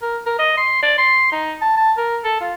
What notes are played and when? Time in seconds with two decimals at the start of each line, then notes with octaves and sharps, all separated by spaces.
0.02 A#4
0.26 A#4
0.39 D#5
0.57 C6
0.83 D5
0.98 C6
1.32 D#4
1.62 A5
1.77 A5
1.98 A#4
2.24 A4
2.41 F4